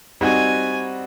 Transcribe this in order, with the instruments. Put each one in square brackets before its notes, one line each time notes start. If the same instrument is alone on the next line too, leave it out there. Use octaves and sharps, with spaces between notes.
[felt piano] G3 C4 D#4 F#4 [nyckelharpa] G#5